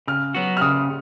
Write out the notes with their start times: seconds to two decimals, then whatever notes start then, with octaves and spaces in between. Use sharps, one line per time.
0.07 C#3 F6
0.35 F#3 B3 F#4
0.57 F6
0.61 C#3 D#6